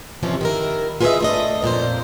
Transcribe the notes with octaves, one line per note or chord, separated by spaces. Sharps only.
F2 C3 E3 F3 C#4
D#3 E4 A#4
F4 G#4 B4 C#5 D#5 E5
A3 D4 D#5
F2 A#2 A#3 C5